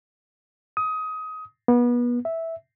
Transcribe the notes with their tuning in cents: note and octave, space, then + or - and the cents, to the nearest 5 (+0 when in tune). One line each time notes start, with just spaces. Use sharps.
D#6 +20
B3 -30
E5 -10